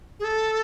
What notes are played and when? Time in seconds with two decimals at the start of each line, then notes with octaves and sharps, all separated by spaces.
0.20 G#4
0.24 A4